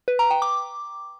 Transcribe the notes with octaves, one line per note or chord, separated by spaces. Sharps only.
B4
A#5
G5
D6